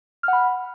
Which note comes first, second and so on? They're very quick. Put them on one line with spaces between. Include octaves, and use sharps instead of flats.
F6 F#5 B5